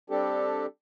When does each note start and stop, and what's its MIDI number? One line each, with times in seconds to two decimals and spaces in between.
0.10 0.66 55
0.10 0.66 60
0.10 0.66 62
0.10 0.66 67
0.10 0.66 69